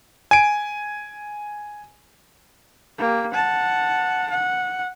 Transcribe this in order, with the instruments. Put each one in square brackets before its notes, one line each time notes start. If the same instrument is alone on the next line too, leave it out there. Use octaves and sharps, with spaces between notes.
[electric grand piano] G#5 D7
[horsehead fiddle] A#3 G4
F#5 A5
F#5